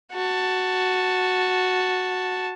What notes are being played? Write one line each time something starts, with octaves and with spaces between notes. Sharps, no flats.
F#4 A5